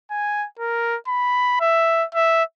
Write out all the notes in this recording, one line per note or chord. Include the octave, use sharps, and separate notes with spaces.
G#5
A#4
B5
E5
E5